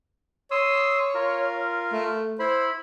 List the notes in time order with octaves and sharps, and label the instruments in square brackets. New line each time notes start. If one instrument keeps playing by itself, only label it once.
[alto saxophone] C#5 [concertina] C6 D#6 E6
[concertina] F4 A#4
[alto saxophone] A3
[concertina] E4 B5 [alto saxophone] C5